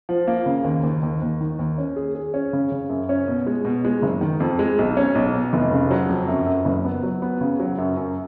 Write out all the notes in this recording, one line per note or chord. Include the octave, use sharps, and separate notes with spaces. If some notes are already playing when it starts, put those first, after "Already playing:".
F3
A#3
C#3
D#2
D#2
D#2
D#2
D#3
D#2
C#4
G#4
G#4
C#4
C#3
C#3
F#2
C#4
B2
G#3
B2
G#3
F#1
D#3
F2
G#3
B1
C#4
B1
B2
F1
C#3
F#3
F2
F#2
F#2
F#1
B3
F#3
B3
C#3
F#3
F#2
F#2